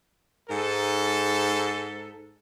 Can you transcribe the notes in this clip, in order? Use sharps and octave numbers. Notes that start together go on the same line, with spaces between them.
G#2 A4